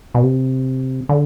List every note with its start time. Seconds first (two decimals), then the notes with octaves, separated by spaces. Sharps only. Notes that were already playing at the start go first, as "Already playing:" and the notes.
0.14 B2
0.23 C3
1.09 D3